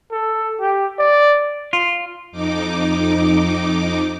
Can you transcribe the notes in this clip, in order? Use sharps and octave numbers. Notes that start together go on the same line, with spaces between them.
A4
G4
D5
F4
F2 D#4 D6